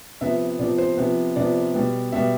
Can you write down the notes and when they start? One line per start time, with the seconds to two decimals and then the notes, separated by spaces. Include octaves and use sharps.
0.21 C3 F3 B3 E5
0.59 C3 F3 B3 D5
0.78 C5
0.97 C3 F3 B3
1.36 C3 F3 B3 D5
1.74 B2 G3 B3
2.12 B2 G3 B3 E5